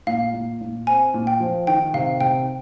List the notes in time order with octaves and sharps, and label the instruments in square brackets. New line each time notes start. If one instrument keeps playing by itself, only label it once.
[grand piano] A#2 [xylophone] F5
[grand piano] A#2
A#2
[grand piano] C4 [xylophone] G#5
[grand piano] A#2
[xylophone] G5
[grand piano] F3
[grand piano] D#3 [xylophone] G5
[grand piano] C3 [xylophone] F5
[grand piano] C3 [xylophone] G5